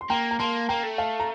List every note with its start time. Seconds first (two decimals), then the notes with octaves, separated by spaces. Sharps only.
0.01 C6
0.10 A#3 G5 A#5
0.31 A#5
0.40 A#3 A5 C6
0.69 A#3 G5 A#5
0.84 A3
0.98 F5 A5
1.20 A#5